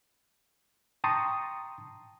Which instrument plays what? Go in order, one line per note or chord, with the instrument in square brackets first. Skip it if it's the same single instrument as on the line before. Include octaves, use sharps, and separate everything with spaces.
[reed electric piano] G5 A5 A#5 C6 C#6 D#6